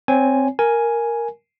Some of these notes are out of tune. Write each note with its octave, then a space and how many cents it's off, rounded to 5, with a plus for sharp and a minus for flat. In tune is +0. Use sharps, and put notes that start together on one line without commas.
C4 +0 C#5 +15 G#5 +0
A#4 +0 G#5 +5